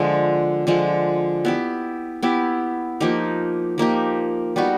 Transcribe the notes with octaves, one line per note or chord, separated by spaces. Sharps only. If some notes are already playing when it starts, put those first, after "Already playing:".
Already playing: D3 F3 G#3
D3 F3 G#3
B3 E4 G4
B3 E4 G4
F3 A#3 D#4 G4
F3 A#3 D#4 G4
G3 B3 D#4 F#4